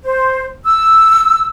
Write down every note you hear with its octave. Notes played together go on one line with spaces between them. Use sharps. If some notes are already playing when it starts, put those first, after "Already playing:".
C5
E6